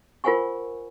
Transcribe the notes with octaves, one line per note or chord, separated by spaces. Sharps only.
F4 A#4 C5 F#5 G#5 C#6